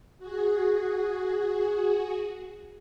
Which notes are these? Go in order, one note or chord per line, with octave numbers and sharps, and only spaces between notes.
F#4 G#4